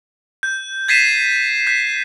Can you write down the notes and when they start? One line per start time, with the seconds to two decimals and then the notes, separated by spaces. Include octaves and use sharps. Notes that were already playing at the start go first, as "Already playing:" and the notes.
0.43 G6
0.88 G#6 A6 B6 C7 D#7 E7
1.67 G6 B6